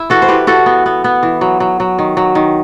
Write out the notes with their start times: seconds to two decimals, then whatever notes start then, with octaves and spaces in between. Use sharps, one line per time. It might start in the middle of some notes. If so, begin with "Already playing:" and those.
Already playing: E4 E5
0.10 E3 F#4 A4
0.22 C5
0.28 E3 G4 B4
0.47 E3 F#4 A4
0.66 B3
0.86 B3
1.04 B3
1.23 E3
1.41 F#3
1.60 F#3
1.80 F#3
1.99 D#3
2.17 F#3
2.35 D#3